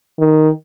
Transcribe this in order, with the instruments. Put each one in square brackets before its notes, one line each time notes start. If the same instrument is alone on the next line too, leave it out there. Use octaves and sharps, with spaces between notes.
[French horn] D#3